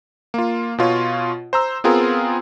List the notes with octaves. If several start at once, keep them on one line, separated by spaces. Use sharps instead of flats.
A#3 F4
B2 F4 C#5 C#6
C5 A#5 E6
B3 C4 F4 G#4 A#4